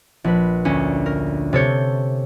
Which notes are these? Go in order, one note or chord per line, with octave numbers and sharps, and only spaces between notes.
A#1 B4
D2 C#4
A#4
C3 A4 C#5 G6